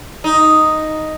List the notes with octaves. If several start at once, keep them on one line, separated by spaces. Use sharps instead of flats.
D#4